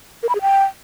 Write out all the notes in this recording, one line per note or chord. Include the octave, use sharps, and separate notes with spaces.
A#4
B5
G#4
G5